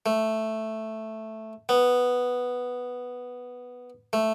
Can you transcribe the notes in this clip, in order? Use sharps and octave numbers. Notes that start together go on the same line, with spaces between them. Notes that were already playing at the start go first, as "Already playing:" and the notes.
A3
B3
A3